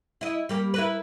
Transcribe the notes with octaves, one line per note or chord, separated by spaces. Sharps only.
E4 D#5
G3 A#3 G4
E4 A#4 B4